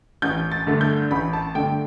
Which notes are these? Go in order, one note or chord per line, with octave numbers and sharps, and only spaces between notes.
A1 G6
A6
G2 D3 A3
G6
A1 B5
A5
G2 D3 A3 G5